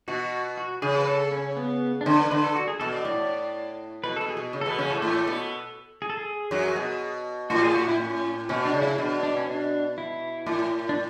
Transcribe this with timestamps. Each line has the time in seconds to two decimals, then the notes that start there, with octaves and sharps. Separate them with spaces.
0.08 B2 F#4
0.57 F#4
0.82 C#3 G#4
0.98 B4
1.07 A4
1.31 C#4
1.57 B3
2.01 D4
2.06 D3 C#4
2.19 B4
2.31 D3 B4
2.44 A4
2.55 F#4
2.68 G#4
2.80 B2 A4
2.93 D5
3.05 A2
4.04 B2 B4
4.16 A4
4.21 B2
4.29 G#4
4.37 B2
4.53 C#3
4.61 A4
4.66 B2 B3 B4
4.78 C#3 C#4
4.87 A2 A3 A4
5.02 A2 A3
5.27 B2 B3
6.02 G#4
6.10 A4
6.17 G#4
6.51 F#2 F#3
6.76 B2
7.50 A2 F#4
7.63 G#4
7.75 F#4
7.88 E4
8.00 C#4
8.49 B2 C#4
8.65 D4
8.74 C#3
8.82 E4
8.98 B2 D4
9.23 D4
9.37 C#4
9.50 D4
9.98 E4
10.46 A2
10.89 D4